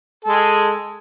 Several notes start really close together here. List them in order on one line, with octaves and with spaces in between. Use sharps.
A4 G#3 G#4